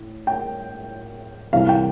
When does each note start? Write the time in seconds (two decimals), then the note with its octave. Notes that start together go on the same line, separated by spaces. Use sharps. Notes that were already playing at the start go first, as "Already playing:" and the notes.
Already playing: A2
0.27 G5
1.53 C2 C3 E3 F5
1.69 G5